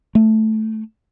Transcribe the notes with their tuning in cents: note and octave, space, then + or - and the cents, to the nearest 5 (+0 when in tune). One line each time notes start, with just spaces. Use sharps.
A3 -5